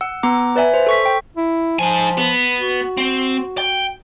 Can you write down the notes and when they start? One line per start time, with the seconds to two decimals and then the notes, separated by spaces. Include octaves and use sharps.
0.01 F#5 E6
0.23 B3 F#5 A#5 D6
0.56 B4 D5 E5 G#5
0.74 C5
0.87 A4 C#6 B6
1.05 G5
1.37 E4
1.79 F3 D#4 G#5
2.18 B3
2.58 F#4
2.97 C4
3.58 G5